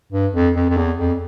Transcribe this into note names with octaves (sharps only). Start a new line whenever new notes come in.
G2
F2
F2
F2
E2
F2